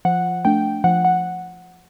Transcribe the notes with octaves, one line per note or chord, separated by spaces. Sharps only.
F3 F#5
A3 D4 G5
F3 F#5
F#5